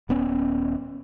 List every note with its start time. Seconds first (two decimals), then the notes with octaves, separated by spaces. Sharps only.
0.09 D#1 B3 C#4